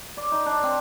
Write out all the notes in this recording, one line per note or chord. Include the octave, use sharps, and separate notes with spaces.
D5
D#4
D4
C4